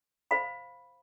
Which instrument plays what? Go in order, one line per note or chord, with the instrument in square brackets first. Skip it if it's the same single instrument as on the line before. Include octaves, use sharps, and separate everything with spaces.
[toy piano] C5 F5 B5